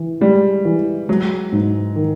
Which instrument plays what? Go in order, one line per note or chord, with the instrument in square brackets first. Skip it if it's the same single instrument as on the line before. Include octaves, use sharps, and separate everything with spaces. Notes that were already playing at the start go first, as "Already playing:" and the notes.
Already playing: [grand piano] E3
[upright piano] G3 [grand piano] G#3
[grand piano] E3
[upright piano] F#3 [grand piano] G#3
[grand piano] G#2
D#3